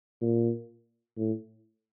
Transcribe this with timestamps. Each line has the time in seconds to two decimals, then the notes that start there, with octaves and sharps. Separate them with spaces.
0.21 A#2
1.17 A2